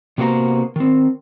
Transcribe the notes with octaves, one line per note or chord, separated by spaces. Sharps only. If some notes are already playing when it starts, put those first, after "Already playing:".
C3 A#3 B3 F#4 C5 A#5
D#3 C4